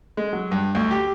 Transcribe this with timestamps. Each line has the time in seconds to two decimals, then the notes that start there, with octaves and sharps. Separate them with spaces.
0.17 G#3
0.33 F#3
0.52 G2
0.75 D2
0.91 G4